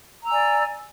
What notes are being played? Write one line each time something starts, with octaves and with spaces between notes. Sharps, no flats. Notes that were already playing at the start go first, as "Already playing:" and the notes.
D5 G#5 A#5 E6